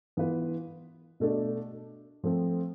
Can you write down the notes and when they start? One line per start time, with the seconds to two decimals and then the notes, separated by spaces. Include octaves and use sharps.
0.17 E3 B3 F4 B4
1.20 B2 A3 D4 A4
2.24 F3 A3 C4